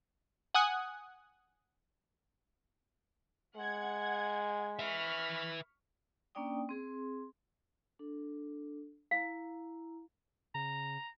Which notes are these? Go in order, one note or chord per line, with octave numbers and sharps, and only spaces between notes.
F#5 G#5 D#6 F#6
G#3 F#5 G#6
B4 E5 C#6 F6 B6
A#3 C#4 D4 D5 G5 D#6
C4 G#4 C6
D4 A4
E4 F5 A#5
C#3 A#5